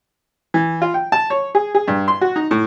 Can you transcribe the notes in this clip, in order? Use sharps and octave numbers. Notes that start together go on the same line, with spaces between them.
E3
F4
G5
A5
C#5
G#4
G#4
G2
C6
F#4
D#4
A2